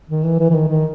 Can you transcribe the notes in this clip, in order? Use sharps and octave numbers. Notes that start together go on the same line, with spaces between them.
D#3
E3
E3
E3
D#3
D#3